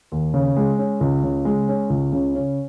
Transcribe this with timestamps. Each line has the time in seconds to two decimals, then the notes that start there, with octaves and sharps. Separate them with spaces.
0.12 D#2
0.34 C#3
0.57 G#3
0.79 C#4
1.01 C#2
1.23 C#3
1.45 G#3
1.69 C#4
1.90 C#2
2.12 C#3
2.35 C#4